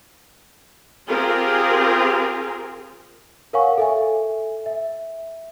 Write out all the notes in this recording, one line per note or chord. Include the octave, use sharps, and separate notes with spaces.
C4 F4 G4 G#4 A#4
A#4 C#5 F5 F#5 G#5 C#6
A4 E5 G#5
E5